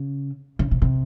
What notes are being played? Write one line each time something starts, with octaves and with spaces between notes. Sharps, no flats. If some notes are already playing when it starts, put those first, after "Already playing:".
Already playing: C#3
C#3
C3
C3